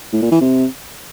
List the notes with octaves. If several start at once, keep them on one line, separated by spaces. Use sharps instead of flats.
A2
A#2
E3
C3